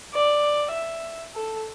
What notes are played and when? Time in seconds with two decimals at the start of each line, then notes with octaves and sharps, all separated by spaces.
0.14 D5
0.71 E5
1.35 A4